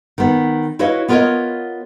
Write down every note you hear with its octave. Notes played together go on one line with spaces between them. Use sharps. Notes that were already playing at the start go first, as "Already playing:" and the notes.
D#3 B3
E4 F#4 B4 C#5 D#5 F5
B3 F4 A#4 B4 C#5 D#5